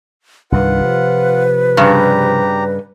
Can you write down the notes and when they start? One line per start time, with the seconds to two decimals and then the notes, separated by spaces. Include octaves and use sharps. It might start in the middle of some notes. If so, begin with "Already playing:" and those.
0.52 C2 G2 D#3 F4 B4 F#5
0.81 C3 F3
1.77 G2 C#3 G4 A#5